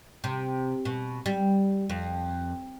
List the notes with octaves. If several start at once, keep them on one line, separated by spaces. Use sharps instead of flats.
C3
B2
G3
F2